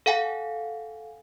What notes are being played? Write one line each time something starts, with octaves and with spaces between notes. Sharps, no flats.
A4 F5 F#5 G#5